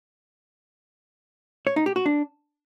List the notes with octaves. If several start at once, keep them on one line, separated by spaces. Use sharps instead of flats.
C#5
D#4
G4
F#4
D4